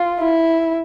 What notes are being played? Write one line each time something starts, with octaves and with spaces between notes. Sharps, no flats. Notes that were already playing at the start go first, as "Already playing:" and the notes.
Already playing: F4
E4